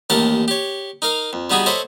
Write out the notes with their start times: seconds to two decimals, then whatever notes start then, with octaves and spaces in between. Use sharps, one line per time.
0.10 A1 D#2 G4 A#4 F#5 A5
0.48 G4 C#5
1.02 D#4 A#4 F5
1.33 F2
1.50 G3 B3 D#4 F#4 G#4
1.66 A4 C5 C#5 D#5 E5 B5